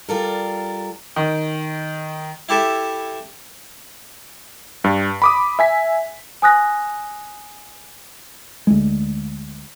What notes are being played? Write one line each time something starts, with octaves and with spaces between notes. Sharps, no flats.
G3 F4 A4 A#4
D#3
E4 G4 A4 E5
G2
B5 D6 D#6
E5 G#5 B6
G#5 D#6 F#6 A#6
D2 G#3